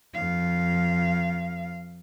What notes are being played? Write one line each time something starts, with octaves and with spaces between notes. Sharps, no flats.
F2 F5